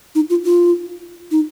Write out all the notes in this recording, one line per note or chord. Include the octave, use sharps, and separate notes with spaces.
D#4
F4
F4
D#4